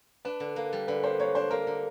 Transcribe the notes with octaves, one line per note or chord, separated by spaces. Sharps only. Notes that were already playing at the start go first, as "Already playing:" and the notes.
D4 B4
D3
A#3
G3
D3 B4
A#3 C5
A#3 C#5
D4 C5
A#3 A#4
D3